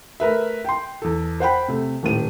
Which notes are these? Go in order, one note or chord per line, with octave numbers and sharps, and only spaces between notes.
A3 A#4 B4 E5
G5 C6
E2 A4
C5 F#5 G5 B5
C3 A3
D#1 A2 D#7